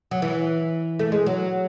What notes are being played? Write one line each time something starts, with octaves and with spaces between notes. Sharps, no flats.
F#3
E3
A3
G#3
F#3